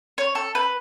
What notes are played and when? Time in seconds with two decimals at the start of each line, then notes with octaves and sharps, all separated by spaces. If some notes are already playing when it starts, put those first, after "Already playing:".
0.18 C#5
0.35 A4
0.55 B4